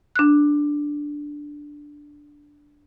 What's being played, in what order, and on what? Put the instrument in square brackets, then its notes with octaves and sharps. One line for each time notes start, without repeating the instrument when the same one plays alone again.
[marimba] D4 F#6